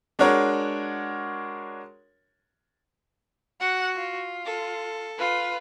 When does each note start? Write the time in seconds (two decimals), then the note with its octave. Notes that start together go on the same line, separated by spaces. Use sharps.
0.19 G#3 D4 F#4 A#4 C#5
3.60 F#4 F#5
3.96 F4
4.45 A4
5.18 F4 B4